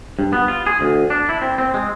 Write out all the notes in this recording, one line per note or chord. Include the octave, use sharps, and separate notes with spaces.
G2
B3
F4
G#4
D2
D4
E4
C4
C4
G#3